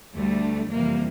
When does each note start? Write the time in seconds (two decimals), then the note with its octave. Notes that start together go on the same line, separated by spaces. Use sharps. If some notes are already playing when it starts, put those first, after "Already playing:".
0.14 D2 D3 G3 A3
0.70 F2 C3 E3 G3 A#3